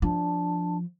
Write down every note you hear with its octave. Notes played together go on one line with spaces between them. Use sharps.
F3 D4